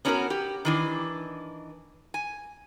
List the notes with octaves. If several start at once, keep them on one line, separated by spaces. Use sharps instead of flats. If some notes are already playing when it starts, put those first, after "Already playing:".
B3 C#4 D4 F4 F#4 A#4
G4
D#3 E3 D4
G#5